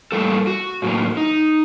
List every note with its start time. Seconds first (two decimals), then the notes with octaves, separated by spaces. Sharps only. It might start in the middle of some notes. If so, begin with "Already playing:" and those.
0.12 A2 G3 A#3 A4
0.47 F#4
0.82 A2 F#3 A#3
1.17 D#4